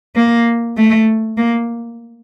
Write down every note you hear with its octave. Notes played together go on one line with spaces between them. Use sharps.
A#3
A3
A#3